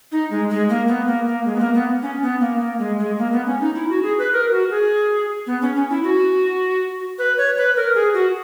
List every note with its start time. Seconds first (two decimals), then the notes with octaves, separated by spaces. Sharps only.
0.12 D#4
0.31 G#3
0.50 G#3
0.69 A#3
0.88 B3
1.07 A#3
1.27 A#3
1.45 G#3
1.55 B3
1.60 A#3
1.74 B3
2.02 C#4
2.22 B3
2.40 A#3
2.60 A#3
2.79 G#3
2.98 G#3
3.18 A#3
3.32 B3
3.46 C#4
3.60 D#4
3.75 E4
3.89 F#4
4.03 G#4
4.18 B4
4.32 A#4
4.51 F#4
4.70 G#4
5.47 B3
5.61 C#4
5.75 C#4
5.90 E4
6.04 F#4
7.18 B4
7.37 C#5
7.57 B4
7.76 A#4
7.95 G#4
8.14 F#4